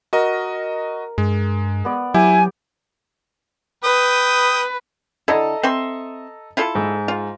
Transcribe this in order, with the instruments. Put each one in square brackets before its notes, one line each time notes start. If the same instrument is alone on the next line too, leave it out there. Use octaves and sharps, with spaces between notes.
[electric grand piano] F#4 D#5 [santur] A#4
[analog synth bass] G2 [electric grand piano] G#3
[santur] B3 D5
[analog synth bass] F#3 [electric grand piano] E4 [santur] G4 [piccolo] G#5
[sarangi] B4 [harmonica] G5 D#6
[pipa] D3 E4 [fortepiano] A4 D#5 A#5
[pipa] C4 E5 C6
E4 F4 A4
[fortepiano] G#2
[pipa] F4